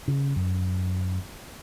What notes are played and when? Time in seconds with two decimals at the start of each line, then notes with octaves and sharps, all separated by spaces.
0.08 C#3
0.36 F#2